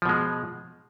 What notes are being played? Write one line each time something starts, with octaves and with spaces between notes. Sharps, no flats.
B2 F3 G#3